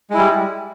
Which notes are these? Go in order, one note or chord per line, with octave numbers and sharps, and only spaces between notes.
G3 G#3 E4